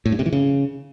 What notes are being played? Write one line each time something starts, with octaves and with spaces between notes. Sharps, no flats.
A2
G2
C3
E3
C#3